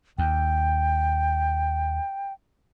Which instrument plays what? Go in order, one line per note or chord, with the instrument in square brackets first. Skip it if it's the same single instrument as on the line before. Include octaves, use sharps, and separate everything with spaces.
[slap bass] D#2 [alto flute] G5